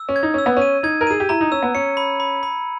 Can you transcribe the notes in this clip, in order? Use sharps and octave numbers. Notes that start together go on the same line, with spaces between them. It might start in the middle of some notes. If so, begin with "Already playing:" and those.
Already playing: E6
C#4
G#6
D#4
C#4 E6
B3
C#4 D#7
D#4 G#6
A#4
G#4 D#7
G4
E4 A#5
D#4
C#4 E6
B3
C#4 C#7
B5
B5
B5